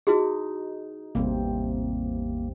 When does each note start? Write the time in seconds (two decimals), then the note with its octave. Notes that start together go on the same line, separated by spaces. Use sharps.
0.07 D#4 E4 F#4 G#4
1.15 A1 E2 C3 G3 A#3 C4